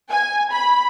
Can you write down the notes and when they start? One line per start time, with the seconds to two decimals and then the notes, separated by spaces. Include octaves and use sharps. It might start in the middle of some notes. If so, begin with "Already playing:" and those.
0.10 G#5
0.52 B5